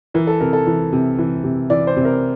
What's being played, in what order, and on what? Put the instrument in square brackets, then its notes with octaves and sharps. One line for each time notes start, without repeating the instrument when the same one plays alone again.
[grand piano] E3 A#4
A4
C3 A#4
A4
E3
C3
E3
C3
E3 D5
C5
C3
A#4